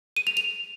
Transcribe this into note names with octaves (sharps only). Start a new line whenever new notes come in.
D#7
F7
F7